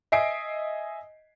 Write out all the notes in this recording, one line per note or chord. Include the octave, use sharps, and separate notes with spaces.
D#5 E5 G#5 C7 D7